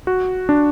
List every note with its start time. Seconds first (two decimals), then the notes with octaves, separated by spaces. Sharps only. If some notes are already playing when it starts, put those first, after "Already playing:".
0.07 F#4
0.49 D4